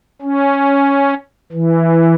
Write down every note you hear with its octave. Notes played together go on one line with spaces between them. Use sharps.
C#4
E3